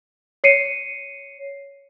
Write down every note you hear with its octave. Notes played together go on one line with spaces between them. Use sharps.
C#5 C7 C#7 D#7